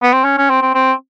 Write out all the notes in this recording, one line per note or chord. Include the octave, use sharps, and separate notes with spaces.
B3
C4
C#4
C#4
C4
C4
C4